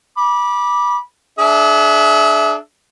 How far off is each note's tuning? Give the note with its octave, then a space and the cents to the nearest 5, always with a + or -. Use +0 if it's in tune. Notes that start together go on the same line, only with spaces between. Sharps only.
B5 -25 D6 +0
D4 +0 G#4 +40 E5 +0